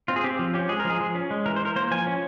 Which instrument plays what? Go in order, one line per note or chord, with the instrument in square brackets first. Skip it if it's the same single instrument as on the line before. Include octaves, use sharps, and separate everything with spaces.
[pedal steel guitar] C4 F4
G#4
C4 G4
F3
C#4 G4
G#3 G#4
A#4
F3
G#4
F3
C#4
G#3
E3 A#4
C5
E3 A#4
A#3 C5
F3 G#5
C#4